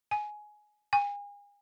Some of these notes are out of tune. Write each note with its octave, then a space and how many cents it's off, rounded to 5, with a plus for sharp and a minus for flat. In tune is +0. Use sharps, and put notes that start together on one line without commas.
G#5 +15
G#5 -35